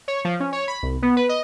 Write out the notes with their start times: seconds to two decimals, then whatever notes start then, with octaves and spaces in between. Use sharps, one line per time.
0.08 C#5
0.25 F3
0.40 C#4
0.52 C#5
0.68 B5
0.82 C2
1.02 B3
1.17 B4
1.29 D#5